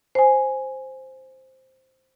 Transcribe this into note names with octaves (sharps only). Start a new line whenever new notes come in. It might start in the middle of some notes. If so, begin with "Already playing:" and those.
C5 G#5